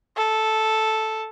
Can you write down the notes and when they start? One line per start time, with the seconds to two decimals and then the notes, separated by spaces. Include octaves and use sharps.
0.17 A4